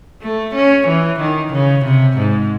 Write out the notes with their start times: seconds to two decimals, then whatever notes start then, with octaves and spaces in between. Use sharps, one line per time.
0.22 A3
0.55 C#4
0.87 E3
1.19 D#3
1.53 C#3
1.84 C3
2.17 G#2